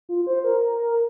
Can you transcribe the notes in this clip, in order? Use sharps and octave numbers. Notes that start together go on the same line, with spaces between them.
F4
C5
A#4
A#4
A#4